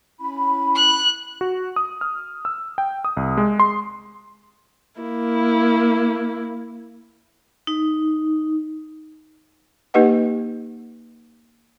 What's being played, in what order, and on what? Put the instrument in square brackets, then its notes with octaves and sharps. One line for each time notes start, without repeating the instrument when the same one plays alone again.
[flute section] C#4 E4 B5
[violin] F#6
[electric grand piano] F#4
D#6
F6
E6
G5
D#6
C2
G#3
C6
[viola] A#3 E4
[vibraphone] D#4
[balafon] A#3 D#4 G4 B4 D#5 F#5